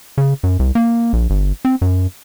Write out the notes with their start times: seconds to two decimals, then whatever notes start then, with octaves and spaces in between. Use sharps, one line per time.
0.18 C#3
0.43 F#2
0.59 C2
0.75 A#3
1.13 A#1
1.30 G1
1.65 C4
1.82 F#2